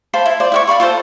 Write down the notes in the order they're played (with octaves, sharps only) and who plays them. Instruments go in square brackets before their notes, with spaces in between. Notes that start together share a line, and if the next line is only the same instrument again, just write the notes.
[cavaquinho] C5 F5 A5 B5
E4
F4 C5 D5
E4 F5 C#6
D5 F5 B5 C#6
F4 A4 C5 A5